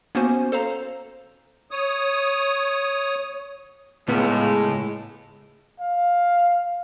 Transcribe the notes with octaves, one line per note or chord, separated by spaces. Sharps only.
A#3 B3 C#4 F#4 C5 G#5
A4 C5 F5 A#5
C#5 D#6
C#2 A2 G#3 B3
F5